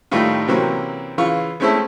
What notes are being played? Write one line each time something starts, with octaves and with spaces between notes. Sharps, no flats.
A2 D#3 G3 A3 D#4 F4
C3 E3 F#3 A#3 C4 C#4
C#3 E3 F4 F5 C#6
G#3 A3 C4 C#4 E4 A4